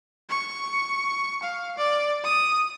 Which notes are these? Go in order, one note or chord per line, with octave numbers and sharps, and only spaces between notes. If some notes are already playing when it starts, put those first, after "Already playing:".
C#6
F5
D5
D#6